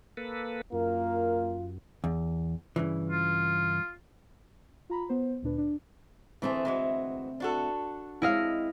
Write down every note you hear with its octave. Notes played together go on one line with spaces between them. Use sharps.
A#3 A4 B4
F#2 A#3 F4 A#4
E2
G2 C#3 E3
F4
F4 A#5 B5
B3 C5
D2 A#2 D4 B4
D4
D2 E3 A3 C4 G#4 E5
E3 G#3 F#4
D4 F#4 A4
G#3 C4 E4 D#5 F5